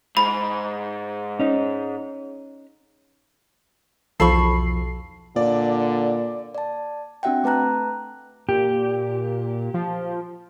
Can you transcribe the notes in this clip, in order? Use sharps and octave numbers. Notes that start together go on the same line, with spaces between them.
G#2 B5
C#4 D#4
B1 E2 F3 A4 B5 C#6 C7
A#2 D3 D5
D5 A5
C4 D4 F#4 E5 F#5 G5
A3 B4 A5 A#5 F#6
A#2 G4
F3